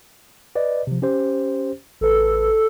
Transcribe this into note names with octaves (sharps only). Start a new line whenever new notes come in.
B4 D5 D#5
C3 F3
C#4 G4 C5
A1 A4 B4